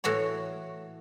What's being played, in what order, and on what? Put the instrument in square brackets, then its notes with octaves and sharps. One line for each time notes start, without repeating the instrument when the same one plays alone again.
[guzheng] A2 E3 F#4 C#5